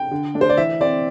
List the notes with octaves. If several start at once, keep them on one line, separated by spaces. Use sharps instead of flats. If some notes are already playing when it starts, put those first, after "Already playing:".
Already playing: G5
D3
A3 D4
C5
D5
E3 E5
C4 D5